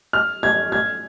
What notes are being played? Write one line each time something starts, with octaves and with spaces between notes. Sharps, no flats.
F6
G#6
G#6